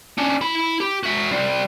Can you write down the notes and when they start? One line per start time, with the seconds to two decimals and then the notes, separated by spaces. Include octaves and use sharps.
0.18 C#4 D4
0.41 E4 B5
0.80 G4
1.03 F#4 E5
1.31 G3 C4